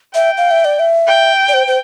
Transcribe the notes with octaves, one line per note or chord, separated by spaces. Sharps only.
E5 G5
F5
E5
D5
E5
G5
D5
C5
C5